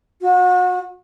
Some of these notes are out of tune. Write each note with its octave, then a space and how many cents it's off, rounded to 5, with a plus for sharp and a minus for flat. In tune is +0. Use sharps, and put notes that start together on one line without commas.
F#4 -35